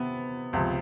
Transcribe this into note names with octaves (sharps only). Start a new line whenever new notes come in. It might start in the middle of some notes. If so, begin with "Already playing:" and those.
Already playing: C3 B3
C#2 C3 F3